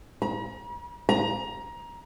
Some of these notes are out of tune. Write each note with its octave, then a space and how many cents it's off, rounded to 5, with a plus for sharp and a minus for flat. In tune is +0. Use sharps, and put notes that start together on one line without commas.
A#5 +45
A#5 +20